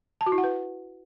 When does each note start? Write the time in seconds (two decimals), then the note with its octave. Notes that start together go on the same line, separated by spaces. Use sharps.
0.21 A5
0.26 F#4
0.32 E4
0.38 F#5
0.44 B4